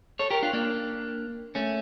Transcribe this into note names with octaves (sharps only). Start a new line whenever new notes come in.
A4 C#5
G4 A#4
D4 F4
A#3 D4
A3 C#4